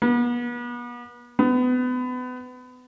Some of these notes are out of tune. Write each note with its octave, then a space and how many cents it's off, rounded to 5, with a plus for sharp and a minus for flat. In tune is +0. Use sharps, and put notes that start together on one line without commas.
B3 -35
B3 +30